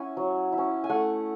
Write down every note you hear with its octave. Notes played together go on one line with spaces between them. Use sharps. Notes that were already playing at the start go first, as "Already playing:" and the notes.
Already playing: C#4 E4 F#5 G#5
F#3
E4
C#4
G#5
A3 F#5